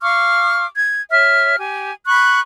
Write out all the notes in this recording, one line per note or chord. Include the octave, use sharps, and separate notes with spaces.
F5 C#6 D6 F6
G#6
C#5 E5 F6
G4 G#5
B5 C#6 F#6